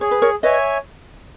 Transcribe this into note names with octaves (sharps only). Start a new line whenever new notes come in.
G#4 C#5
B4
A#4 C#5
B4 C#5 D#5 E5 G#5